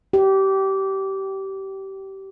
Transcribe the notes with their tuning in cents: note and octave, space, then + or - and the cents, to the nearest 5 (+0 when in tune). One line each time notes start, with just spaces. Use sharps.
G4 -20